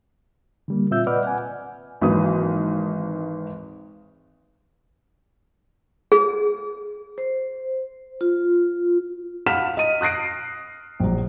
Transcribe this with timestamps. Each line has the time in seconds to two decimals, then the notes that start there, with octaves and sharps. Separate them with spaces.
0.68 D3 G3 A#3
0.91 A#2 C4 F4 E5 E6 G6
1.07 B4 D5 D#5 F#5 D6 F6
1.24 F#5 G#5
2.01 G#1 E3 F#3 A#3 B4 D#6
6.12 G#4
7.18 C5
8.21 F4
9.46 F5 F#5 B5 F6 B6 E7
9.77 D#5 D#7
10.01 D#6 F#6 A#6 C7 D7
11.00 A#1 F#3